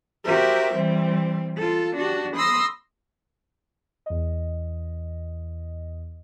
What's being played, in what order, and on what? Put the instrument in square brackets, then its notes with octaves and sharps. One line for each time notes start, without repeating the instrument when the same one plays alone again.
[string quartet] F#4 G4 A#4 C5 E5
E3 G3 C4
F4 A4
D4 F#4 G4
B5 C6 D#6 E6 A#6
[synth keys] E2 D#5